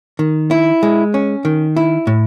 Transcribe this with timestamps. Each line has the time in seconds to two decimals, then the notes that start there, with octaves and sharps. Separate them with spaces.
0.19 D#3
0.51 E4
0.83 G#3
1.14 C#4
1.45 D#3
1.77 E4
2.07 A2